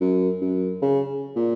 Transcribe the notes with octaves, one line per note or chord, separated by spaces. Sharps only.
F#2
F#2
C#3
A#2